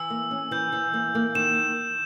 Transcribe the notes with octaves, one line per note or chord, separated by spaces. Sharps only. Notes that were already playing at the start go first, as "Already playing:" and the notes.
Already playing: E3 E6
A#3
C#4
E3 G6
E3
A#3
A#3
D#3 E7